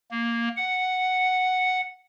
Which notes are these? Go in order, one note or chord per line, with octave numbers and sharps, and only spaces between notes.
A#3
F#5